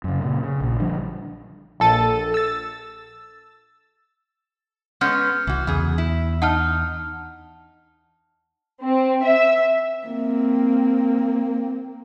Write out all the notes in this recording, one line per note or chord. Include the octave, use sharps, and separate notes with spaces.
F#2 C#3
A#2 C#3
C#3
A#1 A#2
D3 F3 G3 D4
A#1 A4 A6 D#7
E6 A6
G#3 B3 C#4 F#5 F6 G6
C2 E3 F#4
E2 C#3 G#4
E4
D#4 F#5 A5 F6
C4
E5
A#3 C4